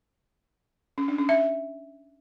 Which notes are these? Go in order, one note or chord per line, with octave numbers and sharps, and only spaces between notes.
C#4
D4
C#4
E5